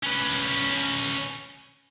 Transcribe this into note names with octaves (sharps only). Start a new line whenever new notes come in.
C#4 B4